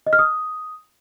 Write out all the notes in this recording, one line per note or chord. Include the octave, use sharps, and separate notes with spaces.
D#5
F6
D#6